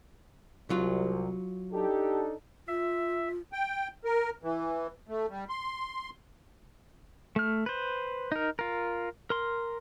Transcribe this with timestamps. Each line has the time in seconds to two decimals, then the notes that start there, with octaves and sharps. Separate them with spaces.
0.70 C2 F#3 F4
1.73 D4 D#4 G4 A4
2.68 F4 E5
3.53 G5
4.05 A#4
4.43 E3
5.08 A3
5.29 G3
5.49 C6
7.36 A3 F6
7.66 B4 C5
8.32 D#4 A#4
8.59 F4 A#4
9.30 A#4 C6